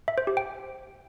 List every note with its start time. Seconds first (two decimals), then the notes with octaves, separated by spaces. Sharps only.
0.08 E5
0.18 C5
0.27 G4
0.37 G5